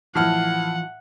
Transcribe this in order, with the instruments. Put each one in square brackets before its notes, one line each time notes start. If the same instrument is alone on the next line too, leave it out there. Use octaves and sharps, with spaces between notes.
[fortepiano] A2 F6 [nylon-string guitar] E3 F3 [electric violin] F#5